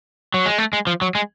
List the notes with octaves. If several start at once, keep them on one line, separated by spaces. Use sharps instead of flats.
F#3
G#3
A3
G#3
F3
F#3
G#3